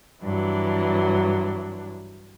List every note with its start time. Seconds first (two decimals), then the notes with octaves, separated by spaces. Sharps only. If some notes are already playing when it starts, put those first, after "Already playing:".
0.24 G2 E3 F#3 D4